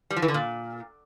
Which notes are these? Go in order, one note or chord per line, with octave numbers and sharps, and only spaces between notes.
G3
F3
E3
D3
A#2